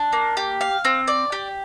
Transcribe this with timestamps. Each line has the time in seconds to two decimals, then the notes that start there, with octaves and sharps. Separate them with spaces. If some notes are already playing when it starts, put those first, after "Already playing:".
Already playing: D4
0.13 A#3
0.37 G4
0.61 F5
0.85 C4
1.08 D5
1.32 G4